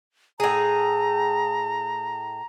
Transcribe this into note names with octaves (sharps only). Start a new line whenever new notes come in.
A2 G#4 A#5